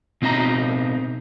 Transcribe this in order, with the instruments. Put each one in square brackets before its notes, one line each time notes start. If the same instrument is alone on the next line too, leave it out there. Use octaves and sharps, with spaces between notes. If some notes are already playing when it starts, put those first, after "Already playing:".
[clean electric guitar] B2 C4 D#4 E5 A#5